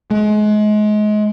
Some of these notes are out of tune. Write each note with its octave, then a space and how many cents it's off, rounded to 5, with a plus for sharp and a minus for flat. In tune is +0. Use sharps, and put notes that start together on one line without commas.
G#3 +30